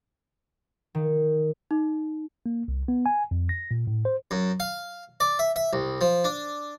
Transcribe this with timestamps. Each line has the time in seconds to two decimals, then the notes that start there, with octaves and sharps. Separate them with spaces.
0.95 D#3
1.71 D#4
2.46 A#3
2.68 C2
2.88 B3
3.06 G#5
3.31 F2
3.49 A#6
3.71 A#2
3.87 A2
4.05 C5
4.31 F#2
4.60 F5
5.20 D5
5.39 E5
5.56 E5
5.73 C2
6.01 F3
6.24 D4